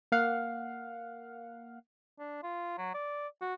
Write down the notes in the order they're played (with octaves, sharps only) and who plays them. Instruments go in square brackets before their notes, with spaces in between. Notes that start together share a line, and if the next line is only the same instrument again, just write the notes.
[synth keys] A#3 F5 F#5
[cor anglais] D4
F4
F#3
D5
F#4